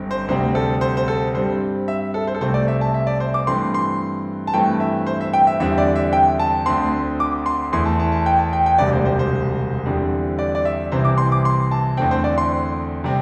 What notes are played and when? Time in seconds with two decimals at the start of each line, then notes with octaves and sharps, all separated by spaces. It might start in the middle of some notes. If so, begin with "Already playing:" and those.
Already playing: G1 G2 D3 C4
0.11 C5
0.28 D2 C3 G3 C4 C5
0.55 A4
0.81 C5
0.97 C5
1.08 A4
1.34 G2 G3 C4 C5
1.88 E5
2.14 A4
2.27 C5
2.35 A4
2.41 C2 C3 A3 C4 C5
2.54 D5
2.68 E5
2.81 A5
2.94 E5
3.07 D5
3.20 C5
3.34 D6
3.47 G2 E3 A3 C4 C6
3.74 C6
4.47 A5
4.54 G2 E3 A3 C4 G5
4.80 E5
5.07 C5
5.21 E5
5.33 G5
5.47 E5
5.60 E2 D3 G3 C4 E5
5.78 D5
5.96 E5
6.13 G5
6.39 A5
6.66 D2 D3 C4 C6
7.20 D6
7.46 C6
7.72 E2 E3 A3 C6
7.86 A5
8.00 A5
8.12 A5
8.26 G5
8.39 A5
8.53 G5
8.66 G5
8.78 E1 D2 C3 G3 D5
8.92 C5
9.05 C5
9.19 C5
9.86 E2 D3 G3 C4
10.39 D5
10.55 D5
10.65 E5
10.92 C2 C3 E3 C4 C5
11.05 D6
11.18 C6
11.32 D6
11.45 C6
11.71 A5
11.97 E2 D3 A3 C4 G5
12.11 C5
12.24 D5
12.38 C6
13.04 C3 G3 C4